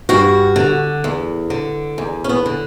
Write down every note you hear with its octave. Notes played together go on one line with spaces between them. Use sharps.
G2 F#4
D3
E2
D3
E2
C#4
B3
D3